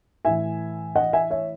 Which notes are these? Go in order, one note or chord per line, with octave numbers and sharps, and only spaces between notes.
A2 E3 E5 G#5
D#5 F#5
E5 G#5
C#5 E5